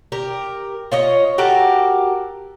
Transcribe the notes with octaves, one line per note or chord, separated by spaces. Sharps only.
G4 A#4
F4 C#5 D#5
F#4 G4 A4 A#4